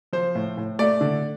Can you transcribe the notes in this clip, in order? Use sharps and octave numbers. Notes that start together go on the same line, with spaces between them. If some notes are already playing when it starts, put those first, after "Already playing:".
F3 C5
A2
A2
A3 D5
D3